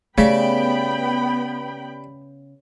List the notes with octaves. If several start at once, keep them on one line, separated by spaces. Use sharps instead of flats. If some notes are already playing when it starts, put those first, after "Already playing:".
C#3 A3 B3 G4 D5 E5 G5 B5